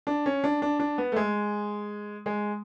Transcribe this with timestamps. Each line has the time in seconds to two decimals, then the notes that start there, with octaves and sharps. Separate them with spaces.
0.07 D4
0.26 C#4
0.44 D4
0.62 D4
0.80 D4
0.98 B3
1.12 A3
1.16 G#3
2.26 G#3